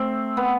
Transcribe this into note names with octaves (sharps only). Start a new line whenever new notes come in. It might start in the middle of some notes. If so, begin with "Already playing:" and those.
Already playing: A3 C4
B3